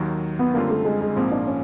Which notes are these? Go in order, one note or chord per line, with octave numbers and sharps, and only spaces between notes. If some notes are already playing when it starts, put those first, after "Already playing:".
Already playing: D#2 D#3 F#3
B3
F#2 D3 G3 A#3 C4 F4
A3
G#3
G#3
A#1 G#2 F3 A#3 C4
D4
C#4